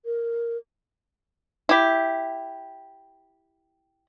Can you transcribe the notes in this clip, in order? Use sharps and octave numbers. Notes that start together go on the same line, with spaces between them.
A#4
E4 G4